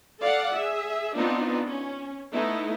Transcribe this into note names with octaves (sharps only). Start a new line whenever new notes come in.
A4 D5 F5 F#5
G#4 E5
B3 C4 D4 D#4 F4
C#4
A3 B3 D#4 E4